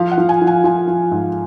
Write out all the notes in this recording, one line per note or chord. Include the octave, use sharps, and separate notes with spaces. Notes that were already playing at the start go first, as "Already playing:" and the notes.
Already playing: F3 F5
F#5
F3
G#5
F3
G#5
F3 G#5
F3
G#2